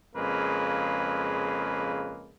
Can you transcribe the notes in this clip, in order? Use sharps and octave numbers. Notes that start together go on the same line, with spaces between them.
F2 C#3 G#3 A#3 B4